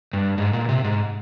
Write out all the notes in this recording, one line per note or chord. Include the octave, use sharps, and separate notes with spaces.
G2
G#2
A#2
C3
G#2